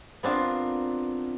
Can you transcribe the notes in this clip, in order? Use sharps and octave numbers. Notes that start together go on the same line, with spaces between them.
B3 C4 D4 F4 A#4